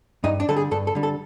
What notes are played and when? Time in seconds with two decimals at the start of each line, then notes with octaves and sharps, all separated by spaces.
0.24 G2 D#4
0.40 D4
0.48 D3 G3 A4
0.57 G#4
0.71 G2 A4
0.87 A4
0.95 D3 G3
1.03 A4